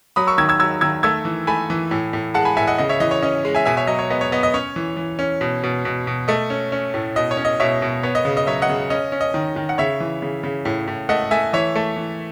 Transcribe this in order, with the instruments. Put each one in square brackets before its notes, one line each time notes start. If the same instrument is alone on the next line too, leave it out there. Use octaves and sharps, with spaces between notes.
[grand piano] F#3 B5 D#6
C#6 E6
D#3 E6 G#6
E6 G#6
F#3 E6 G#6
D#3 E6 G#6
A3 E6 G#6
E3
A3 G#5 B5
E3
A2
A2
G#3 F#5 A5
G#5 B5
A2 E5 G#5
D#5 F#5
C#3 D#5
C#5 E5
E3 D#5
C#5
C#4 D#5
G#3
E5 G#5
B2 E5 G#5
C#5 E5
F#3 D#5
C#5
B3 D#5
C#5
B3 D#5
D#5
C#4 C#5
E3
E3
C#4
B2
B2
B2
B2
A3 D#5
C#4
C#4
A2
B2 D#5
C#5
C#4
D#5
B2 C#5 E5
B2
B3 C#5
D#5
C#3
D#5
F#3 C#5 E5
D#5 F#5
C#3
C#4 D#5
C#4
D#5
D#3
D#3
F#5
C#3 C#5 E5
E3
C#3
C#3
A2
A2
A3 D#5 F#5
A3 E5 G#5
E3 C#5 E5
A3
E3